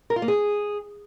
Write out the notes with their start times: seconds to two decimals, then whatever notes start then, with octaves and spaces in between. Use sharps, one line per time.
0.10 A#4
0.16 F4
0.22 A#3
0.28 G#4